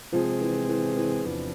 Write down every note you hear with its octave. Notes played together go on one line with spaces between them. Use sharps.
C3 F3 G#3 C4 G#4
E3
E3
E3
E2 C3 F3 B3 D4